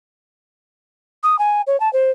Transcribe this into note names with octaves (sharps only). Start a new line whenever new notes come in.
D#6
G#5
C#5
A5
C5